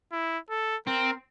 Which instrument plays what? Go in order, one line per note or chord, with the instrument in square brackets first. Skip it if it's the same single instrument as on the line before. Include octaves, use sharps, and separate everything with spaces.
[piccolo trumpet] E4
A4
[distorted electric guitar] C4 [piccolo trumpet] A#4